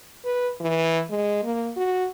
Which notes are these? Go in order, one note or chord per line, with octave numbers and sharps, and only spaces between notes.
B4
E3
G#3
A#3
F#4